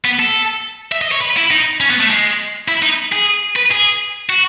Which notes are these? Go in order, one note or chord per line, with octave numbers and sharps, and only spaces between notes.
B3
A4
E5
D#5
C#5
B4
E4
D#4
C#4
B3
A3
G#3
E4
D#4
G#4
B4
G#4
F#4